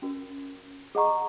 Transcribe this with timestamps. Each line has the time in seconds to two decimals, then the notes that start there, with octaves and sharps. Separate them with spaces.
0.02 C#4 F#4 A#4
0.95 G#4 D#5 F#5 A#5 C#6